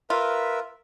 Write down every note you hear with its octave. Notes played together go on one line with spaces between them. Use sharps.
F4 A#4 B4 E5